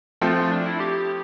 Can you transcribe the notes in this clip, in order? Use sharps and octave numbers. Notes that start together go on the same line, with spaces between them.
F3 A3 C4 F4
F4
D4
E4
G4